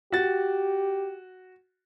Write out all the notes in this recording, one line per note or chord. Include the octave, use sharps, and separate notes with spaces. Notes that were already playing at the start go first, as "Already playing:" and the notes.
F#4 G4 A6